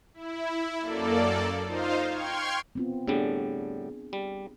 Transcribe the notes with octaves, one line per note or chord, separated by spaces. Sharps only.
E4
F#2 A#3 A4 D5
D#4 F4 C5 F5
G5 C6 C#6 F6 G#6
B3 C4 F4
A2 D3 G3 B3 D4 G#4
G3